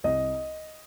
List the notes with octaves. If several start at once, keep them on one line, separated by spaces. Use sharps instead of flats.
C2 D#5